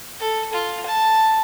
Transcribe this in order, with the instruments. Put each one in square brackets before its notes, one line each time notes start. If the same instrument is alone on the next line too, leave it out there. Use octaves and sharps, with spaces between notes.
[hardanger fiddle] A4
F4
A5